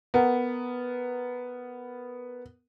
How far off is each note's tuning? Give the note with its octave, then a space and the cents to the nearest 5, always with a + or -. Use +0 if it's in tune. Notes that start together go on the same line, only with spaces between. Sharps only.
B3 +0 A#4 -5